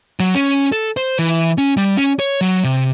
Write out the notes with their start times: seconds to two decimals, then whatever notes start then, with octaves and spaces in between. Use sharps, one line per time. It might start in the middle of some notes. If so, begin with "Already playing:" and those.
0.20 F#3
0.35 C#4
0.72 A4
0.97 C5
1.19 E3
1.58 C#4
1.77 G3
1.97 C#4
2.19 C#5
2.41 F#3
2.64 C3